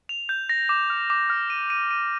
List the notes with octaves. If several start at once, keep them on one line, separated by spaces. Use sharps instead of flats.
F7
G6
A#6
D6
F6
D6
F6
D#7
D#7
D#7